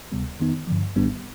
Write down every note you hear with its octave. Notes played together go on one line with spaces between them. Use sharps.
D2 C3 G3 B3
F2 D#3 B3 D#4
G2 D3 F3
G#1 G#2 G3 B3 D4